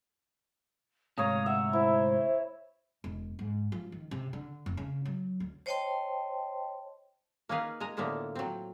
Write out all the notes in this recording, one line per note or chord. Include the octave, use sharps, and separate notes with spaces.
D2 G#2 C3 C#5 F5 A#5 D#6
E5 F#5
E4 C5
E1
G#2
F3
D#3
C3
D3
F1
C#3
F#3
D2
C5 C#5 D#5 G5 A5 C6
A#3 C#4 D#4 G#4 B4 F5
G#3 G#5 A#5
A2 D3 F3 A#3 B3
F#3 C4